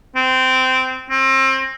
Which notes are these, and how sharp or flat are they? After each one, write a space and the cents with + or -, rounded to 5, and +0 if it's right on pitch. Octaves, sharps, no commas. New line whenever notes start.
C4 -15
C4 +30